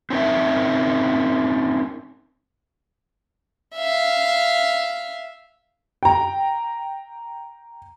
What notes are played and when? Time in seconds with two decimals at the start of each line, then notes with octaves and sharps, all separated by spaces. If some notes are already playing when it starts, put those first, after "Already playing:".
0.10 C4 C#4 D#4 A#4 E5
3.75 E5 F5
6.03 G5 A#5